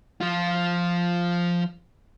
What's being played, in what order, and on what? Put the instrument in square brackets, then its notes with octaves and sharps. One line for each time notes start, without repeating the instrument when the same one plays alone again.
[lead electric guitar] F3 F4